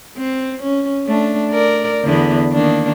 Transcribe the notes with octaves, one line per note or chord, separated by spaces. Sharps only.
C4
C#4
A3 D4
A#4 D5
E2 D3 B3
D#3 A#3 D4